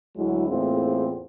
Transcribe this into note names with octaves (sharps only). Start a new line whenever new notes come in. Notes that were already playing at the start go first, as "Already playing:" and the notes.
D2 F#3 G#3 E4
E2 A2 A#3 C4 F4 G#4